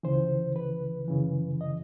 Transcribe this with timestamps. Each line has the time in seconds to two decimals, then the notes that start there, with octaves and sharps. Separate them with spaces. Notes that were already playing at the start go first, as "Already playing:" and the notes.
0.03 C#2 C#3 E3 C5
0.56 B4
1.08 F#2 C#3 E3
1.61 D#5